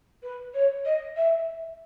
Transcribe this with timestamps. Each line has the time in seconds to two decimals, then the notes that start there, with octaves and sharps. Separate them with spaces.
0.23 B4
0.54 C#5
0.85 D#5
1.16 E5